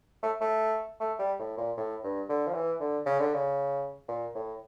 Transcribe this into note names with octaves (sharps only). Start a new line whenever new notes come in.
A3
A3
A3
G3
A2
A#2
A2
G2
D3
F3
E3
D3
C#3
D3
C#3
A#2
A2